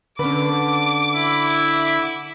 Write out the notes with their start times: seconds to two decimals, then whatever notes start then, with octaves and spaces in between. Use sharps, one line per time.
0.19 D3 C#4 B4 D6
1.15 E4